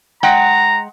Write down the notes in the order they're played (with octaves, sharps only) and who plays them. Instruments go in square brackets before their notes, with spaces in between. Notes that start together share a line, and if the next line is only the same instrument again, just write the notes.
[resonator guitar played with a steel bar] G#3 F#5 G5 [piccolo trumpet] A#5